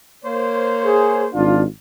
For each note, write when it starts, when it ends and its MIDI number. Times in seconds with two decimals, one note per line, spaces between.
0.25 1.27 58
0.25 1.27 72
0.25 1.27 73
0.85 1.24 68
1.34 1.63 32
1.34 1.63 62
1.34 1.63 65